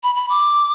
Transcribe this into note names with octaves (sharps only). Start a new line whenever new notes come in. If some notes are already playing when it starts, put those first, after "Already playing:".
B5
B5
D6